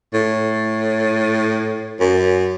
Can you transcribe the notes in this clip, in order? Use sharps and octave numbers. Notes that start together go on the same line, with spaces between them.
A2
F#2